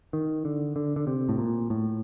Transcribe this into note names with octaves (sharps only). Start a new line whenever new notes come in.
D#3
D3
D3
D3
C3
A2
A#2
A2